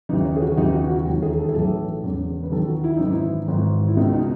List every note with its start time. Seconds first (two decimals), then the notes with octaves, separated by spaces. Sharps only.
0.09 D#2 C#3 E3 D#4
0.25 C#4
0.36 G#4
0.42 F#4
0.57 D#2 C#3 E3 D#4
0.74 F#4
0.90 F#4
1.06 E1 D#2 D#3 F#4
1.22 G#4
1.38 A4
1.49 G#4
1.54 B1 A2 E3 A4
2.03 E1 E2 C#3
2.43 B4
2.51 D#2 D#3 A4
2.68 F#4
2.84 E4
2.97 G#1 F#2 E3 D#4
3.11 E4
3.48 G#1 G#2 E3
3.88 E4
3.97 C#2 B2 D#4
4.13 D#4